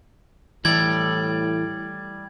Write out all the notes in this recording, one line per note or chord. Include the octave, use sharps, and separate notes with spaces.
A2 E3 G3 A4 D5 G#6